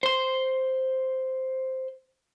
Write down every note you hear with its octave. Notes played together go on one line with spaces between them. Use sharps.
C5 C6